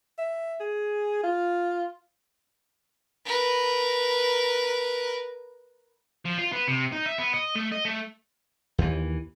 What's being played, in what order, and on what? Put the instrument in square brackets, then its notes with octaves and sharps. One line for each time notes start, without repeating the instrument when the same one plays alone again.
[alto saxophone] E5
G#4
F4
[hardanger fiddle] A#4 B4
[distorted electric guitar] F3
F4
B3
C3
D#4
E5
B3
D#5
A3
D#5
A3
[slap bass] D#2 E3